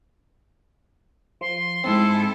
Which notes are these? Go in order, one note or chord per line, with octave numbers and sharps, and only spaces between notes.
F3 C6
G#2 G#3 C4 E4 A4